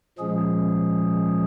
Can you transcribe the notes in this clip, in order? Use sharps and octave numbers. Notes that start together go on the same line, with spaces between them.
A#2 F3 G#3 C#4 G#4